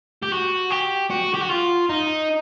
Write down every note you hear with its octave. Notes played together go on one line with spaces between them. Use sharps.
G4
F#4
G4
F#4
G4
F#4
F4
D#4